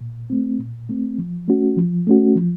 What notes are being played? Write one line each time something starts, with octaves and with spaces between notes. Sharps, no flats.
A#2
A3 C4
A#2
A3 C4
F3
A3 C#4 F#4
F3
A3 C#4 F#4
F3